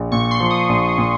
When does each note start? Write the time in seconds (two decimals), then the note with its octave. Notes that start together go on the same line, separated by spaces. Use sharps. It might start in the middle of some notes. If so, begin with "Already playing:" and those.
Already playing: A#1
0.11 A#2 C#6
0.31 C6
0.40 F3
0.50 D#6
0.69 A#1
0.88 D#6
0.98 A#2